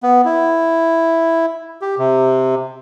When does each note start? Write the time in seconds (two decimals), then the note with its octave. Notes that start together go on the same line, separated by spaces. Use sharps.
0.03 B3
0.25 E4
1.82 G4
1.98 C3